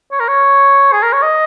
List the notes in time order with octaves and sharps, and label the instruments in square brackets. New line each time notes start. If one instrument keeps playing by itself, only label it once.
[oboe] C#5
A#4
C#5
G#4
A#4
C#5
D#5